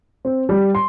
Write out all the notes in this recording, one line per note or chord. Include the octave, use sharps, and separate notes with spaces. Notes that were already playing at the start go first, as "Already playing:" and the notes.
C4
G3
C6